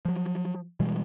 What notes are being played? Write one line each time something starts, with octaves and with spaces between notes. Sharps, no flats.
F3 F#3
B2 E3 G3 G#3